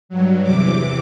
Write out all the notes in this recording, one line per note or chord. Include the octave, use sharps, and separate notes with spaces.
G2 F#3
E2 C3 E3 D6